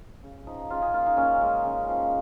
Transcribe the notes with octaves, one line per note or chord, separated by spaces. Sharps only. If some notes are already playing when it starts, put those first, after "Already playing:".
C#3
F3 D#4
C#3 F4
G#4
A#3 F4
D#4
A#2 C#4
G#3
C#3
F3